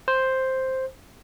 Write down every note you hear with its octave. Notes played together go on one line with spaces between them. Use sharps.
C5